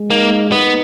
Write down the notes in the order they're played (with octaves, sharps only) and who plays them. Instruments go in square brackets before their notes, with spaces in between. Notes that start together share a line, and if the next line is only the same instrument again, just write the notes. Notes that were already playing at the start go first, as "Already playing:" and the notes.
Already playing: [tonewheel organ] G#3
[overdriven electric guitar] A#3 [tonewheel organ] D#4
[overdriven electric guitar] B3 [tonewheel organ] D#4